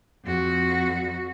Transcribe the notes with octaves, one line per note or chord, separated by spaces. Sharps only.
F2 F#4